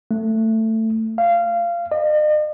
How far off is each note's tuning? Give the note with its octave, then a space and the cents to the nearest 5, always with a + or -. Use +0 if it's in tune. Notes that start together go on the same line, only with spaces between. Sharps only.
A3 +15
F5 -20
D#5 -45